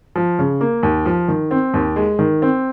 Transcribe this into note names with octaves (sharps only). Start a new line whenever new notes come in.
F3
C#3
A#3
D#2
F3
D#3
C4
D#2
G#3
D#3
C4